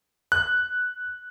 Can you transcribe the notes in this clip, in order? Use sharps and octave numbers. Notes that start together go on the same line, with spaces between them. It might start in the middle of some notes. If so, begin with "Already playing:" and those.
F#6